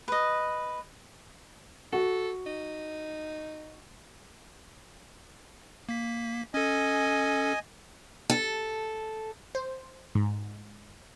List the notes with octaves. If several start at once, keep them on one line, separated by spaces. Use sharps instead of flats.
B4 D#5
F#4 A4
D#4
A#3 B6
C#4 A4 D#5 G#5
A4
C5
G#2